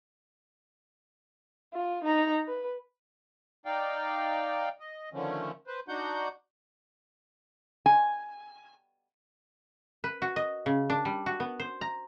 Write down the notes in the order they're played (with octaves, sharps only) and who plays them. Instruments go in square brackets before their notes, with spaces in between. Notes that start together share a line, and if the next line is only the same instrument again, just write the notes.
[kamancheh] F4
D#4 A#5
B4
[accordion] D#4 D5 F5 G5
D#5
D3 D#3 F3 A3 C#4
B4 C5
D4 D#4 F#4 F#5 G6
[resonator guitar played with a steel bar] G#5
[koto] B4
F#4
D#5
C#3
D4
G3
F#4
B3
C5
A#5